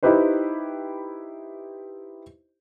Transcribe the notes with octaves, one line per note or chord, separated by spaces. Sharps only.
D#4 E4 G4 B4 C5